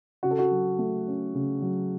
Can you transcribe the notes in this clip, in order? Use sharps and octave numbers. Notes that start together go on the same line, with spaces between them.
C#3 F#4
A4
F#4
F#3
A3
C#4
C#3
F#3